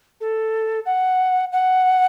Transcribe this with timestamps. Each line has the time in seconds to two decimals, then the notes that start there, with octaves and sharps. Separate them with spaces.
0.21 A4
0.86 F#5
1.52 F#5